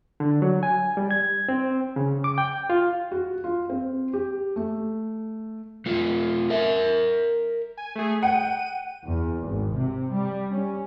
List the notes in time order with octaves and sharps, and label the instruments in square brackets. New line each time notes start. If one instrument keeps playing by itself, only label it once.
[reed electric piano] D3
F#3
G#5
G3
G#6
C4
C#3
D6
G5
F4
[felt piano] F#4
F4
C4
G4
A3
[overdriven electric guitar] A3 F4
A#4 E5
[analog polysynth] G#5
A3 G#4
[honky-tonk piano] F#5 G5 [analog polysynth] D#7
[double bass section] E2
G#1
C3
G3
C#4